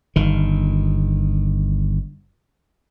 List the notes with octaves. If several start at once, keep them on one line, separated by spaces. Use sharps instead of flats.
G1 D#3